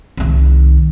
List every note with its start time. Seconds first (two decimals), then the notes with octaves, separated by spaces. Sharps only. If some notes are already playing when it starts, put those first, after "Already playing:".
0.17 C2 D#3